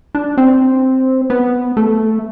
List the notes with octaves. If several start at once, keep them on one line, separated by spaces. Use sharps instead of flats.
D4
C4
B3
A3